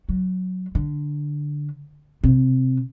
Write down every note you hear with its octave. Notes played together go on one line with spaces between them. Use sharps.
F#3
D3
C3